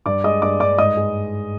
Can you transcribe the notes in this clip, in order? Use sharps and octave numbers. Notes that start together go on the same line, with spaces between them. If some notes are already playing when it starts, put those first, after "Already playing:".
G2 D5 D6
G#3 D#5 D#6
G2 D5 D6
G2 D5 D6
G#2 D#5 D#6
G#3